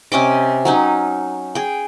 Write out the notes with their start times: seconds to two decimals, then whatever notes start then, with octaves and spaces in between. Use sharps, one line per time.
0.12 C3 C#4 D#5 D6
0.65 F#3 C#4 D#4
1.55 G#4 G5